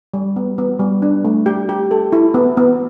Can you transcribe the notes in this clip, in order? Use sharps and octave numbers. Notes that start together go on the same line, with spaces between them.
G3
B3
B3
G3
D4
A3
G4
G4
A4
E4
B3
B3